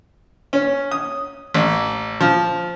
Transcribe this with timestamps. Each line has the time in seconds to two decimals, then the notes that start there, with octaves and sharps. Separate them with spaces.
0.53 C#4
0.91 D#6
1.54 A1
2.20 F3